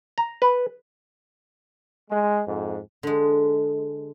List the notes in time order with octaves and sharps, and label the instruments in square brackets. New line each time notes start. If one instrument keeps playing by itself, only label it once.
[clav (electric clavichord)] A#5
B4
[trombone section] G#3
F2 G#2
[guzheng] D3 G#3